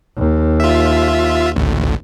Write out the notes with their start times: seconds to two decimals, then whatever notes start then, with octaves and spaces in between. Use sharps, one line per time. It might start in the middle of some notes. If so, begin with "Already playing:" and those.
0.17 D#2
0.60 F4 E5
1.56 A1 D2